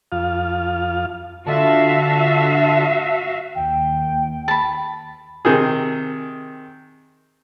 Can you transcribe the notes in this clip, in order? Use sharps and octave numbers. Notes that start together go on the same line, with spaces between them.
F2 F4 F5
D3 F4 F#4 E5 F5 A5
D#2 G5
A5 B5
C3 D#3 G#4